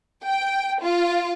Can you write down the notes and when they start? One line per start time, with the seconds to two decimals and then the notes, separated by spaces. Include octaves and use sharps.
0.24 G5
0.81 F4